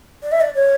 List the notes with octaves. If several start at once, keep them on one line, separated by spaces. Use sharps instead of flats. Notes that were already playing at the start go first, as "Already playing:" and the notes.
D5
E5
D5
C#5